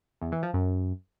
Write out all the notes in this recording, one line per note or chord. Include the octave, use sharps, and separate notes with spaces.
E2
E3
F3
F#2